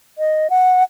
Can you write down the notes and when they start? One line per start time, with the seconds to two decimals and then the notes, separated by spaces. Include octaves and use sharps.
0.18 D#5
0.50 F#5